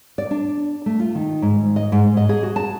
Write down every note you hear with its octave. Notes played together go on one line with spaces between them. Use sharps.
D5
D4
A3
F4
D#3
G#2
D#5
G#2
D#5
G#4
F#4
A5